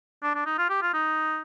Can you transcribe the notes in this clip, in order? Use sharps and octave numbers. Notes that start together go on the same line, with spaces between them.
D4
D4
D#4
F4
G4
F4
D#4